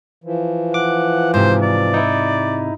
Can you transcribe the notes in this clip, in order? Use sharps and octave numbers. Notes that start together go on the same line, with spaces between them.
E3 F3
F#5 D6
G#2 C3 C5
D5
D#4 E4